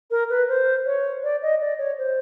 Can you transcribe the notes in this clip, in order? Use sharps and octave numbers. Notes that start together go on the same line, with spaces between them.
A#4
B4
C5
C#5
D5
D#5
D5
C#5
C5